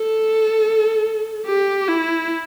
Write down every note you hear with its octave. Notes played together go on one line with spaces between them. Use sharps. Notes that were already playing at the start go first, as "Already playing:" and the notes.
Already playing: A4
G4
E4